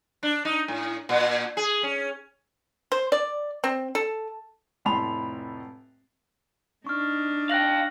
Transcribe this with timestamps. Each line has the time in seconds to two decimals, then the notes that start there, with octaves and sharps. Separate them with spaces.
0.23 D4
0.45 D#4
0.68 A2
1.09 A#2
1.57 G#4
1.83 C#4
2.92 C5
3.12 D5
3.64 C4
3.95 A4
4.85 F1 A2 A5 B5 C6 F7
6.87 D4 D#4 C#6 F6
7.50 F5 G5 F#6 A#6 F#7